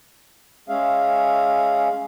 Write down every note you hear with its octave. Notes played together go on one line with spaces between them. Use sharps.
G#3 C#4 G#4 E5 F5